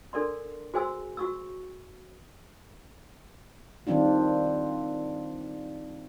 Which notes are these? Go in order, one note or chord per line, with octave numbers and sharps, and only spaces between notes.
D4 A4 A#4 D5 C6
F#4 G#4 C5 G#5 C6 E6
F#4 C#6 E6
D#3 G3 C4 D4 F4